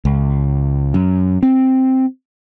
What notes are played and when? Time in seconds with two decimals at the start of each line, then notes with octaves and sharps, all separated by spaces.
0.05 C#2
0.94 F#2
1.43 C4